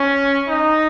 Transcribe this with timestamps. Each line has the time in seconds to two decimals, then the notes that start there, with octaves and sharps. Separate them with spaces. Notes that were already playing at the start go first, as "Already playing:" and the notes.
Already playing: C#4
0.48 D#4